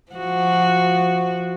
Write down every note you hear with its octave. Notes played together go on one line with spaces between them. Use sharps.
F3 F#4